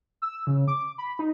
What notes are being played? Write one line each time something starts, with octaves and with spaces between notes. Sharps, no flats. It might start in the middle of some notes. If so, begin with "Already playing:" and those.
E6
C#3
D6
B5
D#4